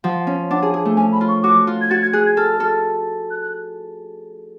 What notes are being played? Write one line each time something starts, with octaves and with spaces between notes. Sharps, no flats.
F3 F#5
C#4
D4 F#5
G#4
G#4
A3
C#4 G#5
B5
F4
C#6
F#4 D6
F4
G#6
F#4 A6
G#6
G#4 F#6
G#6
A4 F6
A4
F#6
F#6